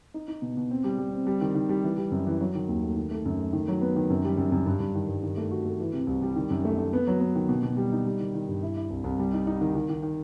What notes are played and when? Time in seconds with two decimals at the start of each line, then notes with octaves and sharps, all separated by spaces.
0.14 D#4
0.28 D#4
0.42 B2
0.57 B2
0.71 C4
0.84 G3
0.98 G3
1.13 C4
1.27 G3
1.41 D#3
1.55 D#3
1.69 G3
1.84 E3
1.98 G3
2.11 F#2
2.27 E3
2.41 F#3
2.55 D#3
2.69 D#2
2.83 A3
2.96 D#3
3.11 A3
3.25 F#2
3.40 A3
3.53 D#3
3.68 F#3
3.81 B3
3.96 D#3
4.10 F#2
4.24 G3
4.38 F#2
4.52 F#2
4.66 G2
4.80 G2
4.95 D#3
5.08 G2
5.23 D#3
5.37 A3
5.51 F#4
5.65 A3
5.80 E3
5.93 C3
6.07 C2
6.22 G3
6.36 D#3
6.50 F#2
6.65 A3
6.78 A3
6.93 B3
7.07 F#3
7.20 B3
7.35 D#3
7.49 B2
7.63 B2
7.77 G3
7.92 D#4
8.06 G3
8.20 D#3
8.35 D#3
8.48 G2
8.63 E4
8.77 E4
8.90 C2
9.04 C2
9.19 G3
9.33 D#4
9.47 D#4
9.61 D#3
9.75 D#3
9.89 D#3
10.03 D#3